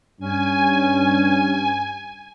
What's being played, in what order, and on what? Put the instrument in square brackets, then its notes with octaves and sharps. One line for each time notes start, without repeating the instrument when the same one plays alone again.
[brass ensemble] G2 [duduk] C#4 [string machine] G#5